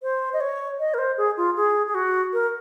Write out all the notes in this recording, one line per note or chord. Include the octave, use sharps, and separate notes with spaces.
C5
D#5
C#5
D#5
A#4
C5
G#4
F4
G#4
G#4
F#4
A#4